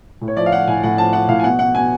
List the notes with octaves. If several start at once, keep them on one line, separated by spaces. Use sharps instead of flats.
A2
C#5
F3 D5
F5
F3 F#5
A2 G#5
A2 F#5
F3 A5
F3 F#5
A2 F5
G#5
B2 F#5
B2 F#5
B2 G#5